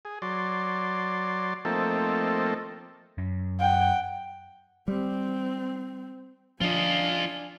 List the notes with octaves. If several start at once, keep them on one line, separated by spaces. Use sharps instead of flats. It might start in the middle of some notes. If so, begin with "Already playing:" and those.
G#4
F#3 D5 C6
F3 A3 A#3 C4 D#4 A4
F#2
F#5 G5
G3 C4
F3 D4 F4 D#5 G#5